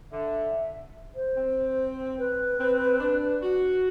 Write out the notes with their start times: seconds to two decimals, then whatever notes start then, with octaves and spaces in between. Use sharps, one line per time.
0.12 D3 E5
1.15 C5
1.36 C4
2.18 B4
2.60 C4
3.00 D4
3.42 F#4